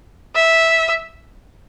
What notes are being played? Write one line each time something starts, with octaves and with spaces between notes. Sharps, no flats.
E5